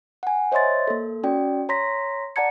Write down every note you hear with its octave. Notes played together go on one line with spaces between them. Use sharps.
F#5 G#5
C5 C#5 D#5 E5 C6 A6
A#3 A4
C#4 F#4 D5 G5
C#5 A#5 C6 A#6 B6
D5 F#5 A5 A#5 G#6 C#7